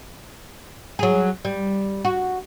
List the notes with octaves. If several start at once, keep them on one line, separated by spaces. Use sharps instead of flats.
F#3 G#4
G3
F#4